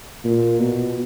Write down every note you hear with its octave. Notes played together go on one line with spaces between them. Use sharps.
A#2
B2